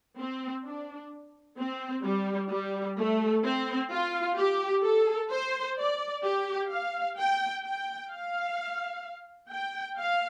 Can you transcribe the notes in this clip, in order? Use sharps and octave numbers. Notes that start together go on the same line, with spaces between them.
C4
D4
C4
G3
G3
A3
C4
F4
G4
A4
C5
D5
G4
F5
G5
G5
F5
G5
F5